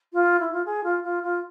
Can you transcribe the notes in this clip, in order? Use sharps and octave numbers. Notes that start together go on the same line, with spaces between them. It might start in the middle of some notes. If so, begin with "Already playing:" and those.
F4
E4
F4
G#4
F4
F4
F4